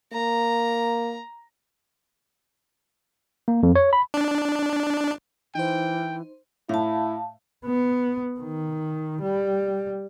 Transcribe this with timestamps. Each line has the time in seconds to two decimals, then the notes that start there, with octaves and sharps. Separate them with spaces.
0.13 A#3 A#5
3.48 A#3
3.63 F2
3.75 C#5
3.93 B5
4.14 D4
5.55 E3 D#4 C5 G5
6.69 A2 E4 F5 A5
7.66 B3
8.40 D#3
9.21 G3